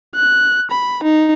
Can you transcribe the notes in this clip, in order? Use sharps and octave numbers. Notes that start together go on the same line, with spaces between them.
F#6
B5
D#4